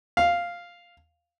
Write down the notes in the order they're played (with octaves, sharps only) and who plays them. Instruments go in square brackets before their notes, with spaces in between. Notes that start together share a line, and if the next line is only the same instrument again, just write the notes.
[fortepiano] F5